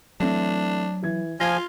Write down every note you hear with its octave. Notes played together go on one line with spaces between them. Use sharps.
E3 F#3 A3 C4 D4
E3 G#6
F3 F4 G#5 F6 G#6 A#6